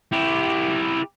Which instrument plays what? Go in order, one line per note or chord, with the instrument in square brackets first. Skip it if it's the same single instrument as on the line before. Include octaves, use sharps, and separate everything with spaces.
[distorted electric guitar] E4 G4